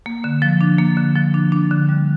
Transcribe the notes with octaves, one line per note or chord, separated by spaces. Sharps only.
A#3
D3
F3
D4
A#3
D3
F3
D4
D4
D3
G3